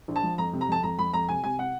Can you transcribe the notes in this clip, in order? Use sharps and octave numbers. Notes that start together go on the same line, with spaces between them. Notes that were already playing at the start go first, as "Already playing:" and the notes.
A#1
A5
F3
F2 A#5
C3
A#5
F2 A5
F2 A#5
F2 B5
F2 A#5
C3 G#5
C3 G#5
C3 F#5